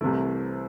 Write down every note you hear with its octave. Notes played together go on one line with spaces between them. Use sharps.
C2 C3 E3 A3 E4